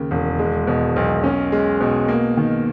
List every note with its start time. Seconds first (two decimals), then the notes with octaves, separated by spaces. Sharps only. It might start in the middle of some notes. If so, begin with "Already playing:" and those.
Already playing: D#2 C#3
0.11 E1
0.39 G#3
0.67 B2
0.96 B1
1.24 C#4
1.52 G#3
1.81 B2
2.08 A#3
2.37 D#3